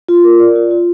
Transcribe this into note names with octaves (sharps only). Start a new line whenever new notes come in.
F4
A#4
D5
F4
F4